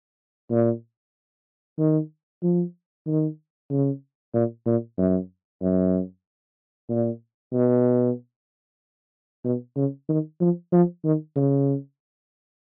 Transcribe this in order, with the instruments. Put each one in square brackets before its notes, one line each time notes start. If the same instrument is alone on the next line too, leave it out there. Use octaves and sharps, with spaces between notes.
[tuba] A#2
D#3
F3
D#3
C#3
A#2
A#2
F#2
F#2
A#2
B2
B2
C#3
D#3
F3
F3
D#3
C#3